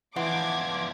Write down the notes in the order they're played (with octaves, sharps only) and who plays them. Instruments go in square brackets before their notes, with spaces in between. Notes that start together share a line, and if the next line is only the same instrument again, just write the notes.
[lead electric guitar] E2 F3 [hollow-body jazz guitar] E3 [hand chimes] F#5 [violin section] D6 G#6